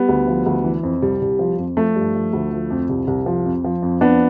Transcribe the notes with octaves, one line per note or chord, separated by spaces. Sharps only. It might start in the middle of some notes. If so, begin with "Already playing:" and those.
Already playing: G3 B3
D2
F3
D2
E3
F2
C2 G3
C2
F3
F2
F3 A3
G2
F3
D2
F3
F2
C2
C2
F3
F2
F3
F2
F3 B3 D4